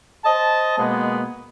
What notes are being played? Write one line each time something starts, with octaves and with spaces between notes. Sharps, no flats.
C5 D#5 A5
B2 G#3 A#3 B3